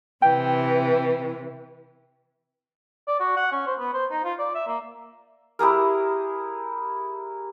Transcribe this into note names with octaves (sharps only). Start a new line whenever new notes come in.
C3 E3 G5
D5
F#4
F#5
C#4
C5
B3
C5
D#4
F4
D5
E5
A#3
E4 G4 G#4 A#4